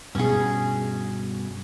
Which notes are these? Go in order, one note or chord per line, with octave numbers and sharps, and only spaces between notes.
G2 B2 C#4 G#4